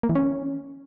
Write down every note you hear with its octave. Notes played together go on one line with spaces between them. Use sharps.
A#3
E3
C#4